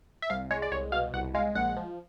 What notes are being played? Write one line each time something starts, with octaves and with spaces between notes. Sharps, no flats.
E5
C2 F5
G#3 C#5
D5
C2 C#5
B2 F5
C2 F#5
G#3 F5
A#1 F#5
F3